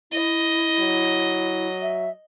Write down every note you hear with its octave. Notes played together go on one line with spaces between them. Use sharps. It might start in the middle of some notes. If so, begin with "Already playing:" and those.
E4 D#5
F#3
E5